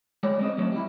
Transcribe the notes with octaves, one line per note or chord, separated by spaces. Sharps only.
G#3 C#5 D5
G#3 C4 D#5
F#3 A3 C4
G3 E4